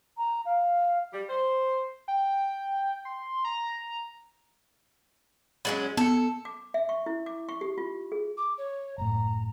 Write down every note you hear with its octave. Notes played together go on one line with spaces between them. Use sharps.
A#5
F5
G3
C5
G5
C6
A#5
F#3 G#3 C#4 B5 A6 F#7
B3 A4 C#7
D6
E5
C#6
E4
D6
C#6
G4
F4
G#4
D6
C#5
F#1 A2 A#5